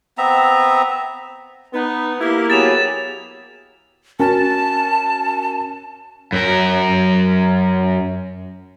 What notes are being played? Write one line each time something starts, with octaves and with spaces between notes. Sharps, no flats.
B3 C4 E5 A#5
B3 D#4
A#3 E4 G4
F#3 B3 G4 G#4 A6 E7 F7
C#4 F#4 A#4 A5
F#2 A#4